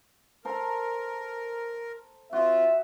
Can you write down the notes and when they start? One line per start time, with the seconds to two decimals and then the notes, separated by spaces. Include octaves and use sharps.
0.45 A4 A#4 C5 A#5
2.33 C4 F4 F#4 D#5 E5